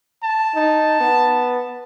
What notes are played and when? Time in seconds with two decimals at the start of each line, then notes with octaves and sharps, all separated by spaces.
0.23 A5
0.54 D#4
1.00 B3